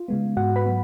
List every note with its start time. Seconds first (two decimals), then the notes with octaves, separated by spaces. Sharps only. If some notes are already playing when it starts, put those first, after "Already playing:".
Already playing: F4
0.08 C#3 G#3 B3
0.37 G#2 F#4 F#5
0.56 B4 B5
0.65 F#3 B3